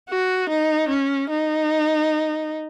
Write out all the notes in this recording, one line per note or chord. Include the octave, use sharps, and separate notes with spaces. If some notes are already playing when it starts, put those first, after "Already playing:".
F#4
D#4
C#4
D#4